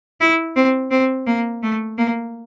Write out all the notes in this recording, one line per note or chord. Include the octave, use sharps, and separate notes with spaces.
E4
C4
C4
A#3
A3
A#3